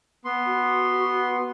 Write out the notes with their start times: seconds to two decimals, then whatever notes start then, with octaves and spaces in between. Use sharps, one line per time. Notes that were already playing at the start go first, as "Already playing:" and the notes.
0.25 B3 C6
0.46 F#4